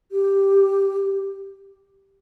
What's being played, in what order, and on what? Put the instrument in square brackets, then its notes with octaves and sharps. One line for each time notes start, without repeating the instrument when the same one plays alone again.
[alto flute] G4